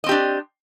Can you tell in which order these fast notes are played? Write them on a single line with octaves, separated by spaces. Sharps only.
D#5 C4 G4 D4